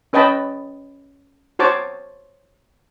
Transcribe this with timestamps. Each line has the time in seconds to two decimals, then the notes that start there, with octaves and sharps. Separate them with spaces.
0.13 C#4 B4 D#5 G5 A5 B5
1.59 F#4 C5 C#5 A5 D6